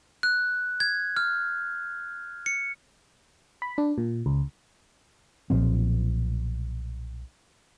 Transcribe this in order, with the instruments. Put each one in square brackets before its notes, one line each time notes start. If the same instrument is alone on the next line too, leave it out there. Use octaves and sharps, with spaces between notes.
[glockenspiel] F#6
G#6
F6
C#7
[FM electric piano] B5
D4
A#2
C#2
[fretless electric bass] B1 A#2 F3 C4